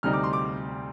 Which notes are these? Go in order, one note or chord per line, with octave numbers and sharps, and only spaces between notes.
D2 C3 G3 C4 D#4 F6
D6
C6
D6